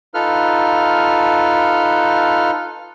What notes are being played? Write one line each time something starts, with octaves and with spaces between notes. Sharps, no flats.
D#4 F4 A4 B4 F6